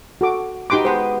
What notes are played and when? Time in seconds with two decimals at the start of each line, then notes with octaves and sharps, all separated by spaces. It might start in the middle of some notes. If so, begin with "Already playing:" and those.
0.21 F#4 A4 D6
0.70 D#4 F#4 G4 B4 C6 D6
0.85 G#3 B3 B4 C5